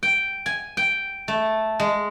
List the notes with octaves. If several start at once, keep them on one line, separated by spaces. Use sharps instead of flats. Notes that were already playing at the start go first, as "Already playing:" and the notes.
G5
G#5
G5
A3
G#3